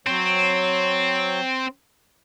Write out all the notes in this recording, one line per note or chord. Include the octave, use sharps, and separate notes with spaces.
F#3 C4 C#5